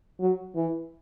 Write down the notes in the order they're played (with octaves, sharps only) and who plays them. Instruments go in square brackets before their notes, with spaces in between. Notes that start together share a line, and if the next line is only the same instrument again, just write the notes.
[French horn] F#3
E3